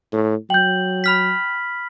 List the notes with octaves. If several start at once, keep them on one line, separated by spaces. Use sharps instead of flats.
A2
F#3 G5 G6 F#7
B5 F6 B6